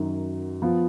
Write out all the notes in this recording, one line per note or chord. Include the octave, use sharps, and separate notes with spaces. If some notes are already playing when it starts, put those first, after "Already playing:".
Already playing: F#2 D#3 F#3
F3 B3 F4